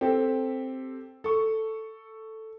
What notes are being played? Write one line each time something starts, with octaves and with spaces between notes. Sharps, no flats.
C4 G4 A4
A4 C#6